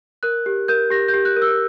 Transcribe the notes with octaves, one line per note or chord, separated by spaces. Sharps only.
A#4 F#6
G4
A#4 G6
G4 A#6
G6
G4
F#6
A#4
E6